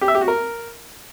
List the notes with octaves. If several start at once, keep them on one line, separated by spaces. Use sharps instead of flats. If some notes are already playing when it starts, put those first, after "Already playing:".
G4
E5
G4
F#4
A#4